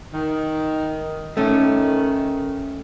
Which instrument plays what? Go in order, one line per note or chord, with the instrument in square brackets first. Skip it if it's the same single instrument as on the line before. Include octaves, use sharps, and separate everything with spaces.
[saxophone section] D#3
[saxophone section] D#3 [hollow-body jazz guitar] A3 C#4